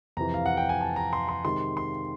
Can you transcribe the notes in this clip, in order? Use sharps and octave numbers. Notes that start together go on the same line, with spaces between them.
F2 C3 E3 A#5
F5
F#5
G5
G#5
A5
A#5
C6
C6
C3 D#3 G#3 C6
C6